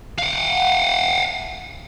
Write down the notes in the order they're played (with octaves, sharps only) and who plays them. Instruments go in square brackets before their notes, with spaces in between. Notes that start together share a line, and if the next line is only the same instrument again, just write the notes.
[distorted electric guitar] F5 F#5